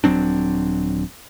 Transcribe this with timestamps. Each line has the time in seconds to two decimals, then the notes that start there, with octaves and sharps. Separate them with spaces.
0.04 D#1 F#3 C4 D4